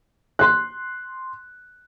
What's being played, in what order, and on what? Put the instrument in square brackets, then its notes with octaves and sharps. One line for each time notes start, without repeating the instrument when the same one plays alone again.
[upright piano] C6 F#6